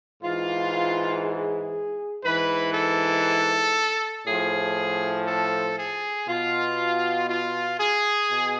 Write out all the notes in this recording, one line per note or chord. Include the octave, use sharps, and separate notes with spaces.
G#2 E3 F4
G#4
G#2 E3 B4
A4
A2 F3 G#4
A4
G#4
B2 F4
F4
G#4
B2